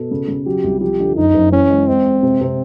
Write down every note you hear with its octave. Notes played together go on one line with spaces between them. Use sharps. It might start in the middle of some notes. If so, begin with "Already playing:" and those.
Already playing: B2 A4
C#3
C#3
F#3 G4
C2
F3 G4
D3
F#1 D#4
F#1
E3 C#4
G#3
G#3 C4
G#3
C3
C3